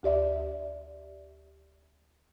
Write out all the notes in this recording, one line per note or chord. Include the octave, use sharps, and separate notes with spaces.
D2 G4 D5 E5